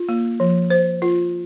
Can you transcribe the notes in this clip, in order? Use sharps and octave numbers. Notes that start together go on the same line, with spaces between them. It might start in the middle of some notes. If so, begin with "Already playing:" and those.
Already playing: F4
A#3
F3
C5
F4